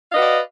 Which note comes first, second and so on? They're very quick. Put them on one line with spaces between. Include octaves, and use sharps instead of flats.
F5 D#5 B4 F#4 D5